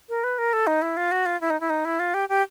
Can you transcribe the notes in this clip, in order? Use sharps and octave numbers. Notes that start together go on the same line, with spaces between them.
A#4
B4
A#4
A4
D#4
E4
F4
F#4
F4
E4
D#4
E4
D#4
E4
F4
G4
G4